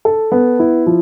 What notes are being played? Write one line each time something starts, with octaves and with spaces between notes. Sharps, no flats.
A4
B3
E4
F3